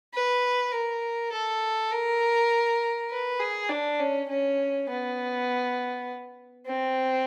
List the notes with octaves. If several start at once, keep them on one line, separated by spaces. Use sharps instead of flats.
B4
A#4
A4
A#4
B4
G#4
D4
C#4
C#4
B3
C4